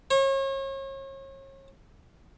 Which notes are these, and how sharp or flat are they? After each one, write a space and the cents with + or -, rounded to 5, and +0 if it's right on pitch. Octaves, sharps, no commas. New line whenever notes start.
C#5 -35